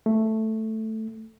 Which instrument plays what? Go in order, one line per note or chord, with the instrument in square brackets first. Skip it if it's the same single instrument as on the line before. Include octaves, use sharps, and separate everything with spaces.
[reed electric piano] A3